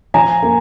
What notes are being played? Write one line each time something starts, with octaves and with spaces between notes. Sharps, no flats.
F3 G#5 A#5
A#3